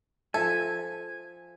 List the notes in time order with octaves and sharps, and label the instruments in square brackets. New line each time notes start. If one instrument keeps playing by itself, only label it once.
[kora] F3 E5 [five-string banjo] A4 [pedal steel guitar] G#5